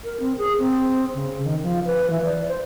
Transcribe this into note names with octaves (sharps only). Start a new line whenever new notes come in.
A#4
C4
G#4
C4
C#3
D#3
F3
B4
E3
D5
C5